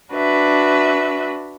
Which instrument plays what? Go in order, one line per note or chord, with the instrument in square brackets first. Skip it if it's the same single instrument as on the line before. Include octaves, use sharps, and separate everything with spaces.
[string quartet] D4 F#4 B4 E5